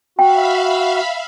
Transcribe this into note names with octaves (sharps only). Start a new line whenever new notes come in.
F#4 E5 F5 G5 B5